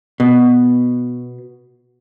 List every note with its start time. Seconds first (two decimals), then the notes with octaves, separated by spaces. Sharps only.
0.20 B2